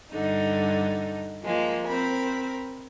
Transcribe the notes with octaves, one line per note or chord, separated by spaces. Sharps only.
G2 D3 D#4
F3 G#3 A#3
C4 A#4 B5